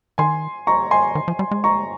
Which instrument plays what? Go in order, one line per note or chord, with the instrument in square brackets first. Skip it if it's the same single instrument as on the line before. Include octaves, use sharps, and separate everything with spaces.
[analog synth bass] D#3 [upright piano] G#5 C6
[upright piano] A#5 C#6
G#5 C6
[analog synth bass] D#3
F3
G3
G#3
[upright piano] A#5 C#6